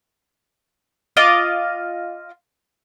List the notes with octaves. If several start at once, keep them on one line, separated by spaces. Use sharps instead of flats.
F4 D#5 F5 D6